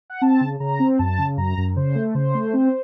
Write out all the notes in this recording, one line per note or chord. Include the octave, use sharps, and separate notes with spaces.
F#5
C4 A5
C#3
C#3 A#5
C4
F#2 A5
C#3
F#2 A#5
F#2
C#3 C5
A3
C#3 C5
A3
C4